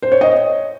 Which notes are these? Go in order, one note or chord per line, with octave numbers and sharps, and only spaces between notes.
C5
C#5
D#5